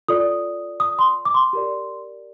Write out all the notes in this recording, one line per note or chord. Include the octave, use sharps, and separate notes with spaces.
F4 A4 D5 D#6
D#6
C6
D6
C6
G4 A#4 D5